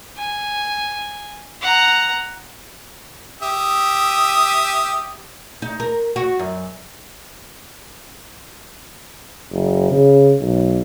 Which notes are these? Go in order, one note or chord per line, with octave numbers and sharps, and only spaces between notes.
G#5
F#5 A#5
G4 E5 D#6
D#4
A#4
F#4
F#2
F#1
C#3
B1